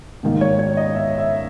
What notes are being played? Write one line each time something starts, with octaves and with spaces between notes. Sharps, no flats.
G#2 D#3 A#3
C#5
C#5
D#5
E5
E5